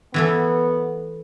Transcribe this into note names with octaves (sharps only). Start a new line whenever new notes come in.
E3 A3 B3 A4